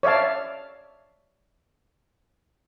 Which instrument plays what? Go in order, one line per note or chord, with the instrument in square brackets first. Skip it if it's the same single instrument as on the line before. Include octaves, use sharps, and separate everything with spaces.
[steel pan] C#5 D5 E5 F5 A5